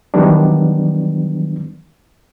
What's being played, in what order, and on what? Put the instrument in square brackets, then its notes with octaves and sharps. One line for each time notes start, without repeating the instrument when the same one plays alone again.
[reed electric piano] D#3 E3 F#3 G3 B3 D4